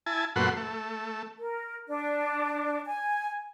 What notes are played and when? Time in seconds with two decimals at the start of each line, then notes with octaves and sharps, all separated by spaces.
0.06 E4 G#5 A5
0.36 F#2 A#2 A3 B4 F#5 C6
0.56 A3
1.38 A#4
1.88 D4
2.86 G#5